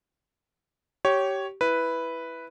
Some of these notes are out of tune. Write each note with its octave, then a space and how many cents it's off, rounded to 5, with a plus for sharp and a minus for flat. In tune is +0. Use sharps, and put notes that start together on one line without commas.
G4 -20 C#5 +0
E4 +0 B4 +0